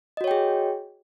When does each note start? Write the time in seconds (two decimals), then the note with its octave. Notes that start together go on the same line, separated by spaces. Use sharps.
0.17 D#5
0.21 F#4
0.24 C#5
0.28 G5
0.31 G#4